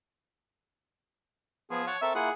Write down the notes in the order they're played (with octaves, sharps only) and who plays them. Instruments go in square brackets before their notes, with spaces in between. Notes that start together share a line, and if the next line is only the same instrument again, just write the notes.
[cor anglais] F3 [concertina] B3 [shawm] G#4
[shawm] C#5 [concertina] F#5 A5
[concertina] C4 A#4 C#6 [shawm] A4 [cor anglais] E5
[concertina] A#3 E4 F4 [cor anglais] G#4 [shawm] F#5